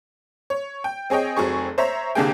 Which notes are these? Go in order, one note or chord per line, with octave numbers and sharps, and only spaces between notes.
C#5
G5
C4 G#4 C#5 D#5 G5
F1 F#3 C4 G#4 C#6
C5 C#5 E5 A#5
C2 D3 G3 A#3 G#4 G5